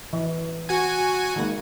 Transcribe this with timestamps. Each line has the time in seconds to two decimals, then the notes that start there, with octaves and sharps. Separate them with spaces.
0.13 E3
0.69 F#4 G#5
1.36 D#3 G#3 A#3